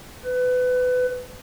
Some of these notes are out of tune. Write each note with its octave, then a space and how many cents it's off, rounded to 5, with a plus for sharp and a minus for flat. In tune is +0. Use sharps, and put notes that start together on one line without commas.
B4 +25